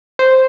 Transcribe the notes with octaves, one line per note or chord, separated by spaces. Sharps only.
C5